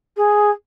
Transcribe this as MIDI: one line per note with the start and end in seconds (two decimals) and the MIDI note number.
0.17 0.50 68